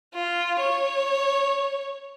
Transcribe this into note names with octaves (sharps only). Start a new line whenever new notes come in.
F4
C#5